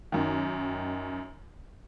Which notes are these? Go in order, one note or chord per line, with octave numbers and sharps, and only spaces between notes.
F#2 D#3